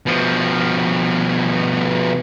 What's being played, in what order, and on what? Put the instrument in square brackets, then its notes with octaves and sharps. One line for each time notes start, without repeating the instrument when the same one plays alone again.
[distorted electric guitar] B2 F3